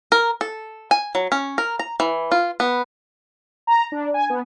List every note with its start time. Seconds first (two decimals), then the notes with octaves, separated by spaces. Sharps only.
0.12 A#4
0.41 A4
0.91 G#5
1.15 F#3
1.32 C#4
1.58 A#4
1.79 A#5
2.00 E3
2.32 F4
2.60 B3
3.67 A#5
3.92 D4
4.14 G#5
4.30 B3